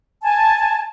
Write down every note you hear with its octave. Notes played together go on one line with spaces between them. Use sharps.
G#5 A5